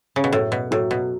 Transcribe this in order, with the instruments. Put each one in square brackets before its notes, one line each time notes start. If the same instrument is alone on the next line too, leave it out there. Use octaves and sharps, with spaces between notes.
[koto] C#3
B2
[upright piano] F#2 [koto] A2
[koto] B2
[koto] A2 [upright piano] F#3
[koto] B2